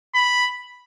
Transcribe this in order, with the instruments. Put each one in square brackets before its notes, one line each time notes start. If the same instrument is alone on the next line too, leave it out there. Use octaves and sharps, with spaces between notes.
[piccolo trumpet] B5